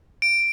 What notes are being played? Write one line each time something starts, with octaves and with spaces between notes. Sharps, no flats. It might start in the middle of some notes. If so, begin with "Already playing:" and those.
D7